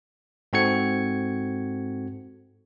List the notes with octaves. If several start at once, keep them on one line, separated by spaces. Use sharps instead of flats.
G#2 C4 F#4 A4 G#6 C#7